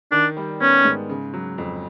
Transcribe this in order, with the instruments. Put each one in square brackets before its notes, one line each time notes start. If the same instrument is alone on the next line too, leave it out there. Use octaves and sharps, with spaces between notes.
[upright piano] D#3 [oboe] D4
[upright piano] G3
[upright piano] B3 [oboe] C#4
[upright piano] G#2
C#3
F#3
F2